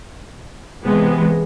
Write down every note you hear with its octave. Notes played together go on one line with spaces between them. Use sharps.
C3 E3 G#3 B3